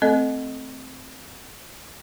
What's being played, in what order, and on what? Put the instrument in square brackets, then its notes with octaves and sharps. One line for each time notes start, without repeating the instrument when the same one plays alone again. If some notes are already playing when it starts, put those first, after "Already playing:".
[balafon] A3 C4 A4 D#5